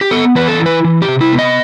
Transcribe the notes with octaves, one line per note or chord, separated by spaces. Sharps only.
G4
B3 A4
E3 B4
A4
E4
B4
E3
G4
C3
E4
B3
D#5